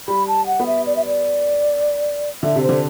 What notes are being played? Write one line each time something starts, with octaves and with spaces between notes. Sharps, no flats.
G3 B5
A5
F#5
B3
E5
D5
E5
D5
D3 E5
C3
C5
D3